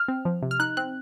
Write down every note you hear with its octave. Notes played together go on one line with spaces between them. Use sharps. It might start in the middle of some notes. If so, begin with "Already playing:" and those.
Already playing: F6
C4
F3
C3
F6
D#4 F#6
C4 F#6